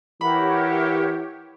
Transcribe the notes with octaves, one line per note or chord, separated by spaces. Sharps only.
E3 G4 A#4 C#5 E5 F#5 B5